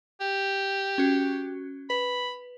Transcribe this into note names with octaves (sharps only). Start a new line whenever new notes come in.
G4
C#4 F#4
B4 B5